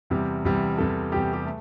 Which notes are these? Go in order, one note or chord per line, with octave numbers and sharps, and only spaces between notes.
E2 C3 G3
E2 C3 G3
E2 C3 G3 A4
E2 C3 G3 G4
G4
A3